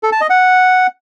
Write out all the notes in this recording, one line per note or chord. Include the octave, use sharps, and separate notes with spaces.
A4
A5
D#5
F#5